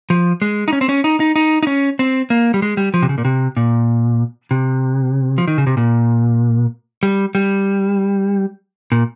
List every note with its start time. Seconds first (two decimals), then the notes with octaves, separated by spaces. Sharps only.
0.10 F3
0.42 G#3
0.68 D#4
0.73 C#4
0.81 C4
0.89 C#4
1.04 D#4
1.20 D#4
1.36 D#4
1.63 D#4
1.67 C#4
1.99 C4
2.30 A#3
2.54 G3
2.62 G#3
2.77 G3
2.94 F3
3.02 C3
3.09 C#3
3.18 A#2
3.25 C3
3.57 A#2
4.51 C3
5.38 F3
5.48 D#3
5.58 C#3
5.67 C3
5.77 A#2
7.03 G3
7.35 G3
8.92 A#2